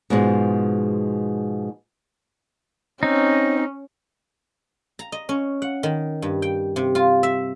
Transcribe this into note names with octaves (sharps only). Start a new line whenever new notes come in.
G#2 B2 F3 G#3
C4 C#4 D#4
A#5
D#5
C#4
F#5
D#3
G2
G5
C3
F4
E5